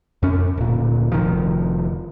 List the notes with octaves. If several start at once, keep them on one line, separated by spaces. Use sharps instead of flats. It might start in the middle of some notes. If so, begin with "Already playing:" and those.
F2 C#4
D1 A#2
F1 D#3 F3